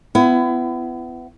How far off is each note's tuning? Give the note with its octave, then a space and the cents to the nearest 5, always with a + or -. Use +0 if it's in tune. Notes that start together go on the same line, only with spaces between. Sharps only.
B3 +30 E4 +35